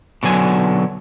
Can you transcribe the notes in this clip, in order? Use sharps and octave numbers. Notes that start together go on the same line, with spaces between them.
B2 D3 F#3 G#5